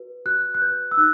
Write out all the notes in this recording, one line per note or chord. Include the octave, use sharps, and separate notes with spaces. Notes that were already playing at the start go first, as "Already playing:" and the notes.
Already playing: F#4 B4
F#4 F#6
F#6
B4 G6
E6
D#4 F#6